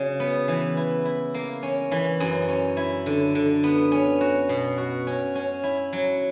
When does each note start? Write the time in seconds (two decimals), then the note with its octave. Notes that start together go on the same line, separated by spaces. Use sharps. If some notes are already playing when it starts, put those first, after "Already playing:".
Already playing: C#3 F#3
0.20 B3
0.48 E3
0.77 E4
1.05 E4
1.34 A#3
1.63 C#4
1.91 E3
2.20 F#2
2.48 C#4
2.77 E4
3.06 D3
3.35 D3
3.63 B3
3.92 C#4
4.21 F#4
4.49 B2
4.78 F#4
5.07 C#4
5.35 C#4
5.63 E4
5.93 F#3